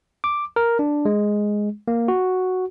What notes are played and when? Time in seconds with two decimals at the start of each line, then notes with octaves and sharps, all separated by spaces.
0.24 D6
0.56 A#4
0.79 D4
1.05 G#3
1.88 A#3
2.08 F#4